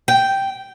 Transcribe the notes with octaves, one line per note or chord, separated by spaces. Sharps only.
G5